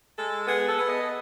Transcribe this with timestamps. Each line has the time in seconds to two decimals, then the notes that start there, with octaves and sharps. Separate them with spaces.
0.17 G#3 A4
0.47 B3 G#4
0.68 A4
0.79 B3
0.88 D#5